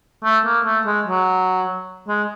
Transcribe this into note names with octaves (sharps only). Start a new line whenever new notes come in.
A3
A#3
A3
G#3
F#3
G#3